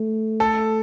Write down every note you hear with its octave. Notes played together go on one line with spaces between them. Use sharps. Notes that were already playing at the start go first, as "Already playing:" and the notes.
Already playing: A3
A4